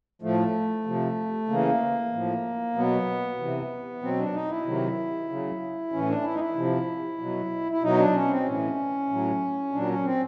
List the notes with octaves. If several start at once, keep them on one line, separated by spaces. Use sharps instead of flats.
A2 F3 A3
C3 F3
C#3 E3 A#3
A2 F3
B2 F#3 B3
C3 E3
B2 F#3 C4
D4
D#4
E4
C3 D#3 F#3
C#3 F#3
A2 E3 C#4
D4
E4
D#4
E4
C3 F3
B2 F#3
E4
B2 F#3 D#4
D4
C#4
C4
A2 E3 C#4
A2 F#3
A#2 F#3 D4
C#4
C4